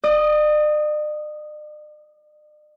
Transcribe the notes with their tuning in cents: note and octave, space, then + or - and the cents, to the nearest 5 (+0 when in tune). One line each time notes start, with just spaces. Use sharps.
D5 +45 D#6 +0